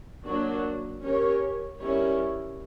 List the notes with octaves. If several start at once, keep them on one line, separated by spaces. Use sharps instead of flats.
F#3 A#3 D4 F#4
C#4 G4 A#4 C#5
G3 C#4 E4 A#4 C#5